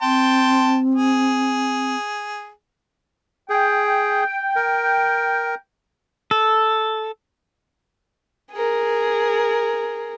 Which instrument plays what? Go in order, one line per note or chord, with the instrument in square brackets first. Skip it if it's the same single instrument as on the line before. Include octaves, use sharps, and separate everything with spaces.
[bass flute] C4 [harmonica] G5 A5 C6
[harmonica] G#4
[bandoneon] G#4 [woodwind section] G5
[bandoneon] A#4
[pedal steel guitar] A4
[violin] G#4 A#4